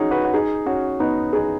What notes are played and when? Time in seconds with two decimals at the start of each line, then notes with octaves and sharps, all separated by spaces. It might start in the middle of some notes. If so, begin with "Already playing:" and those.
Already playing: C#4 D#4 F#4 G#4
0.11 F#4 B4
0.25 F#4
0.34 D#4 G#4
0.66 C#4 F#4
1.00 B3 D#4
1.33 D#4 G#4